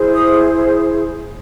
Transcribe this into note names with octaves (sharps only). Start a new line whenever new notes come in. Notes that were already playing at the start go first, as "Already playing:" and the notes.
Already playing: E4 G#4 C5
D#6